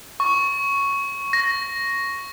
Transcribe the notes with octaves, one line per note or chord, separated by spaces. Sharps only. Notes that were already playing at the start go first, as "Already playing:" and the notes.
C#6
A#6